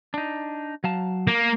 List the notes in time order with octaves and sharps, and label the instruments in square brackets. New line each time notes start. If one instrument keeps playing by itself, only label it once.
[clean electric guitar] D4 D#4
F#3 F5 A5
[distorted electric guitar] A#3